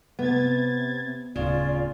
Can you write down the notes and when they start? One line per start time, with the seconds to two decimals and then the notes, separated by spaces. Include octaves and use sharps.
0.19 C3 B3 G#6 A6
1.36 D1 C#3 F4 D5